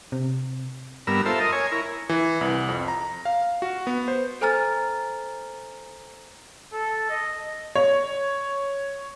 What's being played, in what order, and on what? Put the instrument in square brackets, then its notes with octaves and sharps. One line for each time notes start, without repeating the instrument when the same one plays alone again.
[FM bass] C3
[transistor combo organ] G2 B3 A#4 E6
F4 A4 C5 E5
A#4 D#5
C#5 G#5
E4 A#4
[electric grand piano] E3
C2
F2
A#5
F5
F#4
B3
C5
[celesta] A4 C5 G#5 A#5 F6 A6
[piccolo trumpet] A4
D#5
[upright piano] C#5